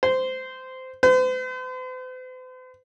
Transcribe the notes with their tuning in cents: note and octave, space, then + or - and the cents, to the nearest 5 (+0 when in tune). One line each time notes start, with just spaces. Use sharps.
C5 -15
C5 -45